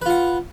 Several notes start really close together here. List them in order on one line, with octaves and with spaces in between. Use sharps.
B4 F4 F#5